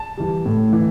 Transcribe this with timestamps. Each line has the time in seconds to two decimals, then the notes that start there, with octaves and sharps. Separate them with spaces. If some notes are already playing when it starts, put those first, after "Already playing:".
Already playing: A5
0.17 E3 G3
0.46 A2
0.73 E3